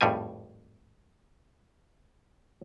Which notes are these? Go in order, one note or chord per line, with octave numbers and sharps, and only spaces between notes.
G#1 F2 A2 G3 G#5